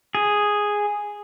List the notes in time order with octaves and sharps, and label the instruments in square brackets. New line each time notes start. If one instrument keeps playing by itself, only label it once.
[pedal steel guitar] G#4